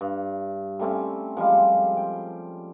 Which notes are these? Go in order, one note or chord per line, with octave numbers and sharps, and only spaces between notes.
G2
G3 A3 C4 C#4
F3 G3 G#3 F5
G5